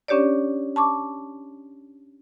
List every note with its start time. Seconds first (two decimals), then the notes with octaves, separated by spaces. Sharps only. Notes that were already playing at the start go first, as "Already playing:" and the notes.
0.08 C#4 D4 G4 C#5 D5
0.76 A5 C#6 D6